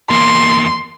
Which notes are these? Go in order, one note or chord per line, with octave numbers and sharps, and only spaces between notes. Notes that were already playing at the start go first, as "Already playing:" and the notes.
E2 A#3 C6